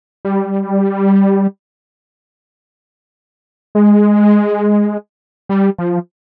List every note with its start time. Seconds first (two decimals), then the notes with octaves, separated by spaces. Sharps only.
0.25 G3
3.75 G#3
5.49 G3
5.78 F3